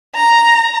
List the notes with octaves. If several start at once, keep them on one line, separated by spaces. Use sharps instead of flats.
A#5